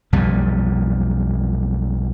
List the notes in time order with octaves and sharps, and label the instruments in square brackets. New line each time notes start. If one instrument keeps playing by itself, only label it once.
[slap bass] B1 F2 A#2 G3